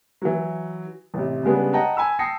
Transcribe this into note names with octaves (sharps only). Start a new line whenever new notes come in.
E3 F#3
A1 C3
C#3 G3 G#3 B3 D4
D#5 F#5 G5 A5 A#5
G#5 B5 E6
G5 A5 D#6 A#6 C7 C#7